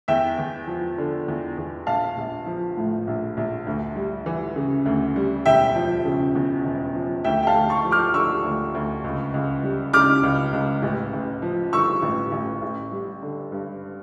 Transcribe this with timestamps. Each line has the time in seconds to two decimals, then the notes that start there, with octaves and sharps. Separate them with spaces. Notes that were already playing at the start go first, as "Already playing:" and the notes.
0.08 E2 E5 G5
0.38 E2
0.67 F3
0.98 D3
1.28 E2
1.58 E2
1.87 A#1 F5 A5
2.17 A#1
2.46 F3
2.77 A2
3.07 A#1
3.37 A#1
3.67 D2
3.96 G3
4.26 E3
4.56 C#3
4.86 D2
5.16 G3
5.46 E1 E5 G5
5.75 F3
6.05 C#3
6.35 E2
6.65 E1
6.95 F3
7.24 D2 E5 G5
7.43 G5
7.47 F5 A5
7.54 D2
7.69 A5 C#6
7.85 F3
7.91 D6 F6
8.14 D3 C#6 E6
8.44 D2
8.75 D2
9.04 C#2
9.34 C#2
9.63 G3
9.93 C#3 D6 F6
10.23 C#2
10.53 C#2
10.82 A1
11.13 A1
11.42 F3
11.73 G2 C#6 E6
12.02 A1
12.32 A1
12.62 A1
12.92 G3
13.22 D3
13.52 G2